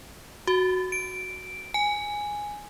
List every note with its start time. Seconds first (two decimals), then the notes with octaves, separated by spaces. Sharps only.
0.47 F#4
0.92 D7
1.74 G#5